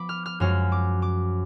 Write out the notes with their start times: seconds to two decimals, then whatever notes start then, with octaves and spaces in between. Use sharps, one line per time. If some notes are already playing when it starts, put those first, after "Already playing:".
Already playing: F3 B3 B5 D6
0.09 F6
0.26 F6
0.40 F#2 F3 G#3 C#4 F6
0.72 D6
1.02 D6